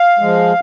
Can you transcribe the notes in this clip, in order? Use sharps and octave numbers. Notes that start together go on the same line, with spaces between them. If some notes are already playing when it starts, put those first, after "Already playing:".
Already playing: F5
F3 G#3